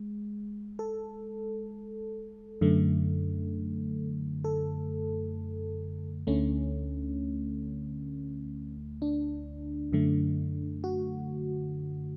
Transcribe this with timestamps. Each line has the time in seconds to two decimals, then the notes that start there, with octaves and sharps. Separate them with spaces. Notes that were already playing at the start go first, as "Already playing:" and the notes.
Already playing: G#3
0.79 A4
2.61 F#2 D3 A3
4.44 A4
6.27 D2 D3 A3 C#4
9.02 D4
9.92 F#2 D3 A3
10.84 F#4